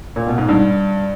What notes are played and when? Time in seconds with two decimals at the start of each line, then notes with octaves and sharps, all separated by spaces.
0.16 A#2
0.27 B2
0.38 G#2
0.49 G2